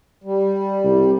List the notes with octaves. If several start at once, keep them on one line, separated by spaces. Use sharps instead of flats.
G3
C2